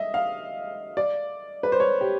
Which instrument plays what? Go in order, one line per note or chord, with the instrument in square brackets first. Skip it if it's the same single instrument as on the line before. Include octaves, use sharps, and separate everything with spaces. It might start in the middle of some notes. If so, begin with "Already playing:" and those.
Already playing: [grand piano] D#5 E5
F5
D5
B4
C5
C#5
G4